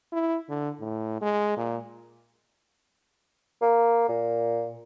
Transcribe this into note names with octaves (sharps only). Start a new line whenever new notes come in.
E4
D3
A2
G#3
A#2
A#3
A#2